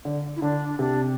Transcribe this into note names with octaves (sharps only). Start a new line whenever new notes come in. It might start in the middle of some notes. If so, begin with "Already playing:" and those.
D3
E4
D3 D4
C3 D4